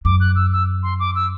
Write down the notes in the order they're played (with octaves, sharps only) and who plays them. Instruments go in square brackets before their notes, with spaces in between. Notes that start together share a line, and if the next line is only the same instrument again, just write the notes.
[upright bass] F#2 [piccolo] D6
[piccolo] F#6
E6
E6
C6
D6
E6